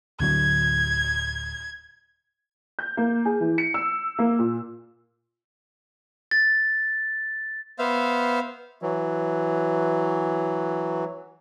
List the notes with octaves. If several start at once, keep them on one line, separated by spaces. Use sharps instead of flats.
D1 D3 F#3 G#6
G6
A#3
G#4
E3
C#7
E6
A#3
A#2
A6
B3 C5 E5 F5
E3 F#3